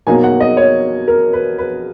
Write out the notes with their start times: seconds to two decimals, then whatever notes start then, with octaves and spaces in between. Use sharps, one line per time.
0.07 B2 F#3 A#3 D#4 G#5
0.23 F#5
0.40 D#5
0.57 C#5
1.08 A#4
1.33 B4
1.58 B4